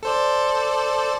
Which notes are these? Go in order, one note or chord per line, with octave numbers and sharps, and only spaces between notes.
A4 C5 D5